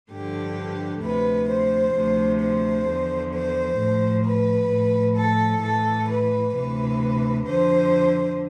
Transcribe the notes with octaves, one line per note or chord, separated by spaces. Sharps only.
G2 D3 F3 G4
D2 C3 F3 B4
C5
D2 C3 F3
C5
E2 D3 F3
C5
A2 F3
B4
A2 F3
A4
A2 E3 A4
B4
D2 C3 E3 B4
F2 D3 F3 C5